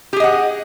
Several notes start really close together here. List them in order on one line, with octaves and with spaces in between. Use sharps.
G4 G#4 D#5 F#5